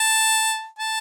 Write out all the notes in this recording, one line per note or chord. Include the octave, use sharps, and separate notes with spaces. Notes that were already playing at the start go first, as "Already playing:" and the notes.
Already playing: A5
A5